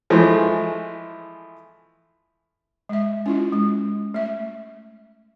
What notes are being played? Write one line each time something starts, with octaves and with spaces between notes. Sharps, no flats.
E3 F3 G#3 A3
G#3 E5
C#4 E4 F4
G#3
A3 E5